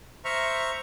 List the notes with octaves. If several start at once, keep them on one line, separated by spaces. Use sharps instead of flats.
C5 E5 A#5 C#6 F6